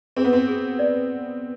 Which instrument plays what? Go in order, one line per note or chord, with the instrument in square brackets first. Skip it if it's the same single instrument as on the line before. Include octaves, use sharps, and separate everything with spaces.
[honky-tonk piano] C4 [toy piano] G#4
[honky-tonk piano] B3
C4
[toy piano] G#4
D5